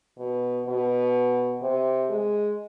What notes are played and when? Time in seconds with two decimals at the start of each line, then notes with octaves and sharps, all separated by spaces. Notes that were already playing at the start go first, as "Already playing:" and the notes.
0.18 B2
0.66 B2
1.61 C3
2.09 G#3